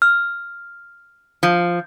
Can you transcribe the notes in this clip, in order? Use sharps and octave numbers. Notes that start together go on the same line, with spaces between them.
F6
F3